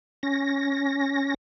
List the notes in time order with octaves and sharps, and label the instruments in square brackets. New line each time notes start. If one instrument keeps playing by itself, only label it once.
[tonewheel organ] C#4 A#6